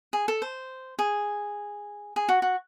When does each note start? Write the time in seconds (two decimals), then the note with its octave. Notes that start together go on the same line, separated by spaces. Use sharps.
0.13 G#4
0.28 A4
0.42 C5
0.99 G#4
2.16 G#4
2.29 F#4
2.42 F#4